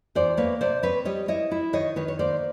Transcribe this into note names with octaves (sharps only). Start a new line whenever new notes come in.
E2 C5 D5
A#3 B4 C#5
C3 C5 D5
C4 B4 C#5
G3 C#5 D#5
E4 C#5 D#5
E4
D#3 C#5 D#5
D#3 B4 C#5
C#5
A#3 C5 D5